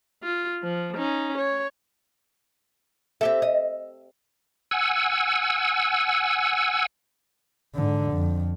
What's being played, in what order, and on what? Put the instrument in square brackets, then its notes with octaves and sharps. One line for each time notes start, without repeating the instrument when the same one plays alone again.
[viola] F4
F3
C#4 D#4
C#5
[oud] C4 G4 A4 [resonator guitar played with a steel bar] E5
[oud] D#5
[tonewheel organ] F#5 G#5 E6
[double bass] G#2 D3
F2